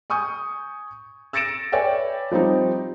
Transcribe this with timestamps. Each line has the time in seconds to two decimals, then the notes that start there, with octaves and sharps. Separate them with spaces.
0.10 G#5 C#6 D#6 G6
1.33 E6 A6 A#6 C#7 D7 E7
1.72 B4 C#5 D5 E5 G5 G#5
2.31 F3 G3 C4 D#4